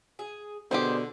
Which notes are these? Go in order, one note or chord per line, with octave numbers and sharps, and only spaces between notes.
G#4
B2 D3 G3 G#3 D4 G4 G#4 C5